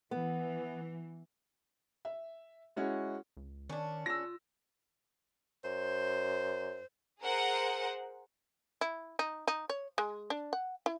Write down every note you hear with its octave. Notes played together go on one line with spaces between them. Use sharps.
E3 B3
E5
G#3 C#4 E4 F#4
C#2
D#3 C#4 D4
F4 E6 A#6
F#2 C5
G#4 A#4 C5 F#5
E4
D#4
D#4
C#5
G#3
D4
F#5
E4